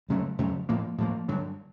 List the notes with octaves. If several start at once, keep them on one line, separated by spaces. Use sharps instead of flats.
F2 C#3 F#3 A3
F2 C#3 F#3 A3
A2 F3 A#3
A2 F3 A#3
G2 D3 F#3